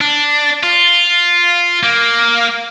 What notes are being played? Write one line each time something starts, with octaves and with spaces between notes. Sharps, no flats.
D4
F4
A#3